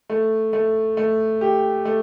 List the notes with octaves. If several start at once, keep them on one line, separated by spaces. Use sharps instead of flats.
A3
A3
A3
G4
A3